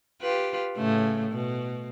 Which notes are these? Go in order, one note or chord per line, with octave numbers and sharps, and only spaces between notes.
F4 G4 B4
A2 C#3 A3
B2